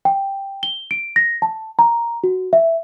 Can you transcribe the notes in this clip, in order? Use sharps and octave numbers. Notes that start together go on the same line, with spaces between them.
G5
G7
D7
A#6
A5
A#5
F#4
E5